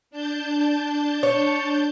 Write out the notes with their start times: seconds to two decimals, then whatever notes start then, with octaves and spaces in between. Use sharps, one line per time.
0.11 D4 A5 G6
1.23 C#5